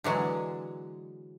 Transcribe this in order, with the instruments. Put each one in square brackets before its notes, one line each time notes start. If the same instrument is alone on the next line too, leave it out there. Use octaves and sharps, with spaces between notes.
[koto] D3 E3 F#3 G#3